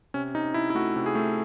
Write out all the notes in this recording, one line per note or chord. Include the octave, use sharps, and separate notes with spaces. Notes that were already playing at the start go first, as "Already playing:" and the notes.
C3 C#4
C3 D#4
C3 E4
E4
A3 F#4
C3
G#4
A3